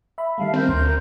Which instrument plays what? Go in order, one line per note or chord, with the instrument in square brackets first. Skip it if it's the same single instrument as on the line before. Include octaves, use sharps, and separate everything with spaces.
[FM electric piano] E5 B5
[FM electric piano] D#3 G3 A3 [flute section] E5 F5 A5
[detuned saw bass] C4 [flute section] A#4 G6
[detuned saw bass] D2 [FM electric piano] C6